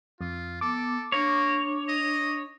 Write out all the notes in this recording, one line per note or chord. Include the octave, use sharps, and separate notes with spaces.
F2 F4
B3 A4 D6
A#3 D4 C#5
D#5